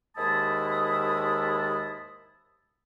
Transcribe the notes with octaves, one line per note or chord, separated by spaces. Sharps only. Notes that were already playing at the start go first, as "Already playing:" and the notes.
D#2 G#2 G#3 E4 A5 D#6